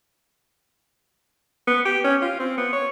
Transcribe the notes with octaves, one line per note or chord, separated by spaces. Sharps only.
B3
G4
C#4
F4
C4
B3
C#5